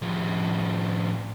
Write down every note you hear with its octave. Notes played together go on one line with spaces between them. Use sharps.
A2 F3